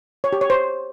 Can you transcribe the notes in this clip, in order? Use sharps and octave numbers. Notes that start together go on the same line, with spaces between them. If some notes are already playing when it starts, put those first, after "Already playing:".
C#5
G4
C#5
C5